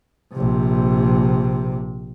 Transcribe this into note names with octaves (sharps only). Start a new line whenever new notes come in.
A#1 C3